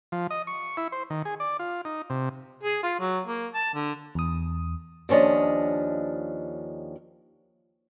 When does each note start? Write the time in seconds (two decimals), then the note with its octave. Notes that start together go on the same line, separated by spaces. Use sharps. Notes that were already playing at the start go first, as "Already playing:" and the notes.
0.12 F3
0.31 D#5
0.47 C#6
0.77 E4
0.92 C5
1.10 D#3
1.25 G#4
1.40 D5
1.59 F4
1.85 D#4
2.10 C3
2.63 G#4
2.83 F4
3.00 F#3
3.26 A#3
3.54 A5
3.74 D3
4.15 E2 D#6
5.09 D#2 F3 C#4 D4 D#5